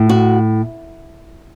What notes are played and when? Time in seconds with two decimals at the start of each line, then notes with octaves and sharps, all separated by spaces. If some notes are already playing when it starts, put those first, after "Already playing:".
Already playing: A2
0.09 F#4